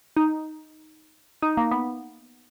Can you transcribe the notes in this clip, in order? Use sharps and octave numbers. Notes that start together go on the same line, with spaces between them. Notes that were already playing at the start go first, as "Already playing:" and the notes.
D#4
D#4
A#3
B3